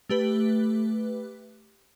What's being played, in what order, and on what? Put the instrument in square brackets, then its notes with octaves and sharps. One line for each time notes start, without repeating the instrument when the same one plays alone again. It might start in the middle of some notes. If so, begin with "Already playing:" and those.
[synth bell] A3 G4 B4